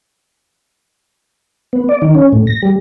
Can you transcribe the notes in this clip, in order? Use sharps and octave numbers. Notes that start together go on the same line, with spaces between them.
B3
D5
D#3
C#4
A2
A#6
G3